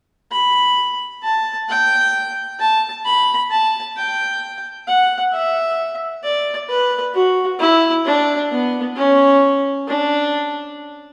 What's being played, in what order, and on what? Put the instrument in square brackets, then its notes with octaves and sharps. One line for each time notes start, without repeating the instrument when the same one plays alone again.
[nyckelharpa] B5
A5
G5
A5
B5
A5
G5
F#5
E5
D5
B4
F#4
E4
D4
B3
C#4
D4